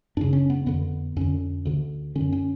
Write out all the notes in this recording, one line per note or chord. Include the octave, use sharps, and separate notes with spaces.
F#2 C#3 D4
C#4
B3
F2 D3 B3
F2 D3 C#4
D2 D3
D3 C#4
F#2
C#4